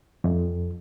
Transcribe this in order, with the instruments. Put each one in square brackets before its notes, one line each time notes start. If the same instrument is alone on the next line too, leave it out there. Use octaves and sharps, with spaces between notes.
[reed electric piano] F2